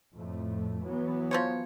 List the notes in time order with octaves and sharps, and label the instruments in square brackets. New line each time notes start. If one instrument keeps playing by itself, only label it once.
[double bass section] F2 A2 A3
E3 F#3 B3
[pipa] F3 C5 C#5